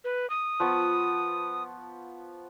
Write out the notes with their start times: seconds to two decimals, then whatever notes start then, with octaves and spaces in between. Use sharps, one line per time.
0.04 B4
0.30 D#6
0.60 F3 B3 C#6